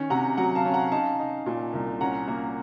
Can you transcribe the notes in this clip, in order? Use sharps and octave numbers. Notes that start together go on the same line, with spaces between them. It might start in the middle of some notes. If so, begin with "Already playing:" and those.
Already playing: D#3 C#4
C3 F#5 A#5
F#3 F#5 A#5
F5 A5
C#4
F#5 A#5
D#4 F5 A5
D#4
A#2
C2
C#4 F#5 A#5
A#3